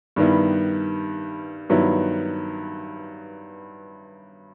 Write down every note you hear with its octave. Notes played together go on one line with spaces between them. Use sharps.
G2 D#3 G3 B3 E4
G2 D#3 F#3 B3 E4